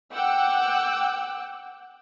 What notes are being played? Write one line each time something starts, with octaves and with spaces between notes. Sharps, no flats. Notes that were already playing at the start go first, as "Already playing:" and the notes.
F#5 G5 D6 E6 F#6